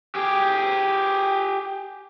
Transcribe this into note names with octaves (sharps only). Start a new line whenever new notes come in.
G4 G#4